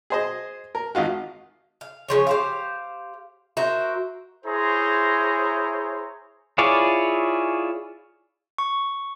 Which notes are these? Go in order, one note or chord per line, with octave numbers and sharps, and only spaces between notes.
G#4 C5 D#5
A#4
G#1 D#4 F4 F#4
F5
C#3 F3 C#5
G4 C5 F5
F#4 A#4 C5 E5
E4 G#4 C5 C#5 A#5 C6
E4 F4 G#4 C#5 D5
C#6